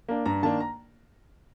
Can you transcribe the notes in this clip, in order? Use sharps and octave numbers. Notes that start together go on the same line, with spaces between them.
A#3 D4
G2 A#5
D#3 A#3 D4 A5
A#5